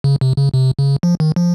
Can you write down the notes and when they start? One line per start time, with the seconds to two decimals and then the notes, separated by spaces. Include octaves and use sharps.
0.04 C#3
0.21 C3
0.37 C#3
0.54 C3
0.79 C#3
1.03 F3
1.20 D#3
1.36 F3